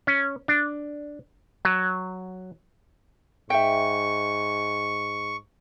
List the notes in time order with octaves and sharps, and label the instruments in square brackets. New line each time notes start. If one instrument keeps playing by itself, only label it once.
[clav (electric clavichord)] C#4
D4
F#3
[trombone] G#2 [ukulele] E5 G5 [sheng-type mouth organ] C#6